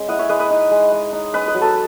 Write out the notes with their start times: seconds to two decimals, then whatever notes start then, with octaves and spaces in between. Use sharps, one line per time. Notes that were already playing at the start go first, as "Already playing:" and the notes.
Already playing: G#3 C#4
0.08 E4 D#5 F#5
0.19 C#5 E5
0.29 G#3 B4 D#5
0.39 B4 D#5
0.50 D#4
0.71 G#3
0.92 G#3
1.13 D#4
1.33 C#4 B4 D#5
1.48 B4 D#5
1.54 F#3
1.61 A4 C#5